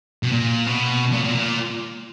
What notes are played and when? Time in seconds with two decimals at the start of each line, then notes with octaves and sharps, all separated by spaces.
0.23 B2
0.32 A#2
0.66 B2
1.12 A#2
1.24 A#2
1.35 A#2